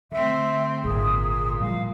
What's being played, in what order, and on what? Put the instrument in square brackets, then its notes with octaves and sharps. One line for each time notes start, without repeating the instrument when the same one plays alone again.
[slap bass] D3 [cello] A3 C4 [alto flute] E5
[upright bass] G#1 [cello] A#2 [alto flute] G#4
[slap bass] A2 F3 G3 [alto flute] F5